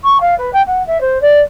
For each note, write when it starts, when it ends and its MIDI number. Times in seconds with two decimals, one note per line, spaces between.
0.03 0.17 85
0.20 0.34 77
0.38 0.49 71
0.53 0.61 79
0.66 0.84 78
0.86 1.00 76
1.00 1.20 72
1.21 1.39 74